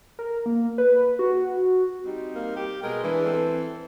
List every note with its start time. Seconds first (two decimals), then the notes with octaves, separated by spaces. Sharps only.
0.19 A#4
0.46 A#3
0.78 B4
1.19 F#4
2.05 G3 C4 D#4
2.35 A#3
2.56 G4
2.83 B2 G#3 A#4 D#5
3.03 E3 G#3 D4 B4
3.25 C4 A4